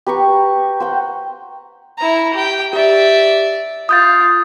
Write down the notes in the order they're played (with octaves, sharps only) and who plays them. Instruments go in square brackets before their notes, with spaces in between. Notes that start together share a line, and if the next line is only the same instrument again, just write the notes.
[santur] G4 B4 A#5 C#6
C5 F#5 G5
[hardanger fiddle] E4 A#5
G4 G5
[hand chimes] G4 [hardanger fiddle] D5 E5
[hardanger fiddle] F4 [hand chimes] D#6 G6 A6